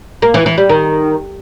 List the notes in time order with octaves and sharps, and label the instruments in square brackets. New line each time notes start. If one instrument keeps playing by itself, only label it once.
[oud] A#3
E3
E3
G3
D#3